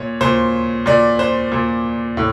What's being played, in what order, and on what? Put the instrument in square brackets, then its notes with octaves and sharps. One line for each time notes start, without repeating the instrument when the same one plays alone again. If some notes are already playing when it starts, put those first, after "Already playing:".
Already playing: [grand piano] A#2 C#5
A#2 C5
A#2 D5
C5
A#2
A2